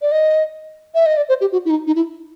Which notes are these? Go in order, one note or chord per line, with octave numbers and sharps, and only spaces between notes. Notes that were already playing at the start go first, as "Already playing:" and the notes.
D5
D#5
E5
D#5
D5
C5
G4
F#4
E4
D#4
D#4
E4